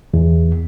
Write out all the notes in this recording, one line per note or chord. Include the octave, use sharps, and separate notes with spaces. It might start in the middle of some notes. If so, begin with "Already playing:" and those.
E2